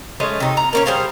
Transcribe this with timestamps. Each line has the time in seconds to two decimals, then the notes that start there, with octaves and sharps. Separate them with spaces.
0.20 G#3 A3 C#4 D#5
0.40 C3 D#4
0.57 A#5
0.73 A#3 C#4 C#5
0.86 G3 G#4 C5 F5